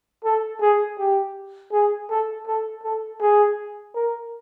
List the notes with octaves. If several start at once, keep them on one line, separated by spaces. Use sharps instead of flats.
A4
G#4
G4
G#4
A4
A4
A4
G#4
A#4